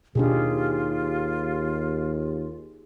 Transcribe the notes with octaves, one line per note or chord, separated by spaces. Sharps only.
D#2 B2 D4 D#4 F4 G4 G#4